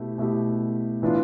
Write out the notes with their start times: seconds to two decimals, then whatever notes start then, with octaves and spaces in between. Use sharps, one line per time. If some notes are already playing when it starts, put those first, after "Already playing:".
Already playing: B2 A3 E4 G4
0.18 B2 A3 E4 G4
1.02 A2 E3 B3 D4 F4